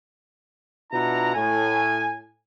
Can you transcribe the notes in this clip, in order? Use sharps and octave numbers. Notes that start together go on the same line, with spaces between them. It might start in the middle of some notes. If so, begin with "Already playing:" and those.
B2 D4 E4 F4 F#5 A#5
A2 G#5